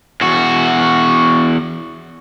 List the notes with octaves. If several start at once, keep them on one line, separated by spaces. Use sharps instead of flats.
E2 F#4